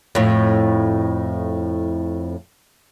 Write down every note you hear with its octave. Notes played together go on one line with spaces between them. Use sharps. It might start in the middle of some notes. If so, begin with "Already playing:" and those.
F2 A2